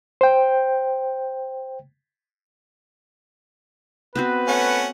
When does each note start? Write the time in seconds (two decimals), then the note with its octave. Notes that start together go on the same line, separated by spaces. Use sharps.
0.21 C5 G5
4.15 B3 C4 F#4 B4
4.48 A3 C#4 F#5